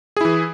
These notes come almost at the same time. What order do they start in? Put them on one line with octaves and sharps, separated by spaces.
G#4 E4 E3